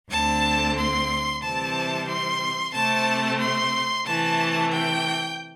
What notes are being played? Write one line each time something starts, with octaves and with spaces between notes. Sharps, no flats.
D2 D3 C4 A5
C6
C3 E3 G3 C4 A5
C6
C3 A3 C4 A5
C6
C3 E3 A3 A5
G5